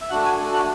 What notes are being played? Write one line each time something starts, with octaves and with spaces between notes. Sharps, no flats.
E5
A3 D4 F#4 F#5
G#5
A3 D4 F#4
F#5